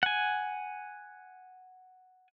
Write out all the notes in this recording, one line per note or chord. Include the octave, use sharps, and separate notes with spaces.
F#5 G#5